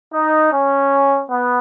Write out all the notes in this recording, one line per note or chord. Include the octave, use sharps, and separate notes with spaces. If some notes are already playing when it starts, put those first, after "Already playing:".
D#4
C#4
B3